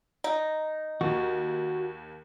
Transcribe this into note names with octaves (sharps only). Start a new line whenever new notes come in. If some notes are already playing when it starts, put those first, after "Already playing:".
D#4
D#2 F#4